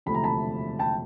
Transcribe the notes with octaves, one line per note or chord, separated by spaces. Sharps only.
E1 D2 C3 F3 A3 B5
A#5
A5 B5
G5 A5